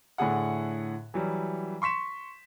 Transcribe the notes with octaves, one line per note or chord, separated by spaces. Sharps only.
A2 D3 G#4 F#5
E3 F#3 G3
C6 C#6 B6 E7